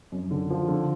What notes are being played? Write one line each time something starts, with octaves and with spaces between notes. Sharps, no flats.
F#2
D3
F3
D3